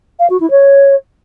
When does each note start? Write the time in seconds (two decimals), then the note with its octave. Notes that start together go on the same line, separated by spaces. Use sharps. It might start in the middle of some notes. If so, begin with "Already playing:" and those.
0.19 F5
0.30 F#4
0.40 E4
0.51 C#5